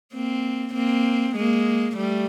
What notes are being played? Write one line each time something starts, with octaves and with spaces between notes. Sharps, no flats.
A#3 C4
A#3 C4
G#3 A#3
G3 A3